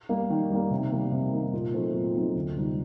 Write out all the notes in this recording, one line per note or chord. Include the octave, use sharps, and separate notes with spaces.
G3 A#3
D#3
G3 A#3
C3
D#3 G3 A#3 D#4
C3
D#3 G3 A#3 D#4
A#2
F#3 A3 C4 D#4
A#2
F#3 A3 C4 D#4
D2
C3 G3 C4 D#4